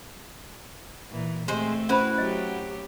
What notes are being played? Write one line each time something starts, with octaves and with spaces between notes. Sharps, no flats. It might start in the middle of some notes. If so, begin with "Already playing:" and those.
A#2 E3
G#3 A3 C4 G4 C5
C#4 E4 F#4 B4 C5 B5
F#3 G4 D#5